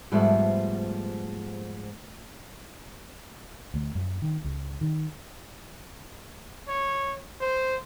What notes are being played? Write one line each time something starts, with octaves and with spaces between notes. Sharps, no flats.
G#2 F3 G3 A3 B3
D2
F#2
D#3
C#2
D#3
C#5
C5